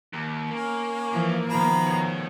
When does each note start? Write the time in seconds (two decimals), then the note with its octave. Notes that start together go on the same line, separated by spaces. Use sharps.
0.13 D#2
0.51 A#3 C#4
1.11 E3 F3
1.49 B2 D#3 F3 A#5 B5
1.87 A3 C#5